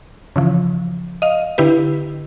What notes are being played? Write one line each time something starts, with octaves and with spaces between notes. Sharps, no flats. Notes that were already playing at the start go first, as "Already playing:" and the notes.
C#3 E3 F3
D#5 F5
D3 E4 G4 B4